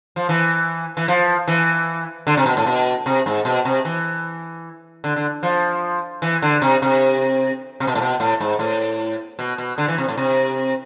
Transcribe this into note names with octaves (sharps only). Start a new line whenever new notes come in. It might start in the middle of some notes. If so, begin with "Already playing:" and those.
F3
E3
E3
F3
E3
D3
C3
B2
A2
B2
C3
G#2
B2
C3
E3
D3
D3
F3
E3
D3
C3
C3
C3
B2
A2
B2
A2
G#2
A2
B2
B2
D3
E3
C3
A2
C3